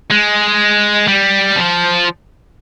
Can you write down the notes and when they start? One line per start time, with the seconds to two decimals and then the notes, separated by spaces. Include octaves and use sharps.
0.11 G#3
1.08 G3
1.56 F3